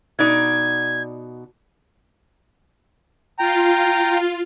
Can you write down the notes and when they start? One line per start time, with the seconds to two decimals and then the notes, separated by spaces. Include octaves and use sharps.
0.19 B2 D#4 D5 G#6
3.39 F4 G5 A#5